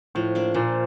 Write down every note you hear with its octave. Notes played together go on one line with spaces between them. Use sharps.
A2 F3
A#3 D4
A#2 F3